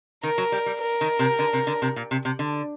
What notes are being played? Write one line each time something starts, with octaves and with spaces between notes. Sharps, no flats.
D#3 A#4
F#3
G3
G3
A#4
D#3
C3
D3
C3
D3
C3
A#2
C3
C3
D3